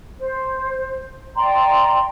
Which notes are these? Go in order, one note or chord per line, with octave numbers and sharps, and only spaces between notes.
C5
D5 G5 A#5 C6